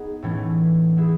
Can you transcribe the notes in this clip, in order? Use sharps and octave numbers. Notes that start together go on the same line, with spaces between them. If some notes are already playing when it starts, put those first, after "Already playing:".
Already playing: B3 D#4 G#4
A2 E3 A3 C#4
B3 E4 G#4